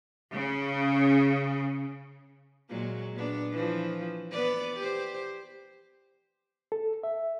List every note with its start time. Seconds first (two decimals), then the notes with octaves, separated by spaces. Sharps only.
0.32 C#3 C#4
2.70 A#2 F#3 G#3
3.15 A#2 B3 D4
3.52 E3 F3
4.31 B3 B4 D5
4.77 G4 C5
6.72 A4
7.03 E5